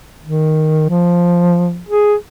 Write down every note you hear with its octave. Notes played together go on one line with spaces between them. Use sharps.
D#3
F3
G#4